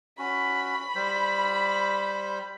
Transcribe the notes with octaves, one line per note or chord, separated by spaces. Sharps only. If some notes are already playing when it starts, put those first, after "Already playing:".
C#4 F#4 B5
G3 C5